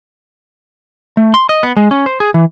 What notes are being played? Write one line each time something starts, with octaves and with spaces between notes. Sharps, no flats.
A3
C6
D#5
B3
G#3
C#4
C5
G#4
E3